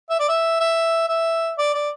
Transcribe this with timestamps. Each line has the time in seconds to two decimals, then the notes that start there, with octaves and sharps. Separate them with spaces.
0.10 E5
0.20 D5
0.29 E5
0.60 E5
1.08 E5
1.58 D5
1.74 D5